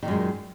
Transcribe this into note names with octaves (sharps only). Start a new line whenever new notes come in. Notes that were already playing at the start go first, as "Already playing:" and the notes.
F#2 A#2 D#3 G#3